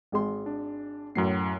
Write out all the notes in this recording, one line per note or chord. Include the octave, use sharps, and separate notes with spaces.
G#1 G#3 C6
D4
F#2 A2 F#3 C7